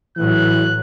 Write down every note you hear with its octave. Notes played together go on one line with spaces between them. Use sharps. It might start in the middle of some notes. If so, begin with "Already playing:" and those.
A2 E3 F#3 F#6